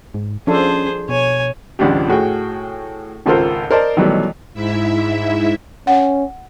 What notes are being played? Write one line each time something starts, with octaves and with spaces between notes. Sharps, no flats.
G#2
F3 C#4 D4 G#4 A4 C5
B2 C#5 G#5
G#1 C#2 F3 D4 G4
A2 F#4 G#4 G5
G#1 C#2 F4 A4 A#4 C5
A#4 C5 D5 D#5 A5
B2 D#3 E3 F#3 G3 A3
G#2 E4 E5
C#4 F#5